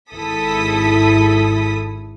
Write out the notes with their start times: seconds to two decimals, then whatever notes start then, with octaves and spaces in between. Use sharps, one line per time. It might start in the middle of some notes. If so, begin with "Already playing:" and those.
0.11 G#1 E4 A4 D#6 B6